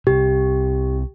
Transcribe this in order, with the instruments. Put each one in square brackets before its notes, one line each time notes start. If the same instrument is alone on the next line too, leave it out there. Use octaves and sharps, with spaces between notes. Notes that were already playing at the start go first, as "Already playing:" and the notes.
[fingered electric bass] C2 C3 [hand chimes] G4